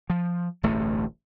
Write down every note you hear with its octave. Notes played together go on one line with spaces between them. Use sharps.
F3
D1 A1 G2 A3